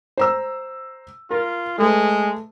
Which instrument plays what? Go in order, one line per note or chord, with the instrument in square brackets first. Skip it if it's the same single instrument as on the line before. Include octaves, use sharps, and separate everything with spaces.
[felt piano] C5 A#5 E6
[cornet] F4 [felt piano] A#4
[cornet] G#3 [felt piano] A3 B4